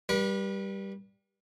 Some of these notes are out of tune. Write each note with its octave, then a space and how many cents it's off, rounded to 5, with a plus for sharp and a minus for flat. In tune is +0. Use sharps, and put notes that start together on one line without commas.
G3 +0 B4 -40